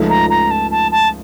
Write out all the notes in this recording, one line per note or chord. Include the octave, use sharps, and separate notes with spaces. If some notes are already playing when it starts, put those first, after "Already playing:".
Already playing: C#2 C#3 F3 A3 D#4
A#5
A#5
A5
A5
A5